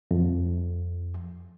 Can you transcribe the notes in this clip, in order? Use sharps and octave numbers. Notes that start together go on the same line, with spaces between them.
F2